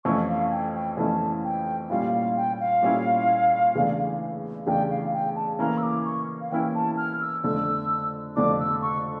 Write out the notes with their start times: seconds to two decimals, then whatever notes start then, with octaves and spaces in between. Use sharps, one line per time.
0.05 F2 E3 A3 C#4 E4 C#6
0.28 F5
0.52 G5
0.75 G5
0.97 F2 E3 A3 C#4 E4 A5
1.44 G5
1.90 A#2 G3 C#4 E4 F5
2.13 F5
2.37 G5
2.60 F5
2.82 A#2 G3 C#4 E4
3.75 E2 C#3 E3 A3 D4
4.67 E2 C#3 E3 A3 D4 G5
4.90 F5
5.14 G5
5.36 A5
5.59 E3 A#3 C#4 E4 A#5
5.78 E6
5.83 D6
6.05 C#6
6.41 F5
6.51 E3 A#3 C#4 E4 G5
6.75 A5
6.97 F6
7.21 E6
7.44 F2 D3 A3 D4 E6
8.36 F2 D3 A3 D4 D6
8.60 E6
8.82 C#6